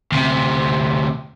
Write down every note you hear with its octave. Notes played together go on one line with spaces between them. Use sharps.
D2 C3